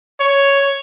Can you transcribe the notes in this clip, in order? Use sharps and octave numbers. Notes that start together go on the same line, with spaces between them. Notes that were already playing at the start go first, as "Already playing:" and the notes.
C#5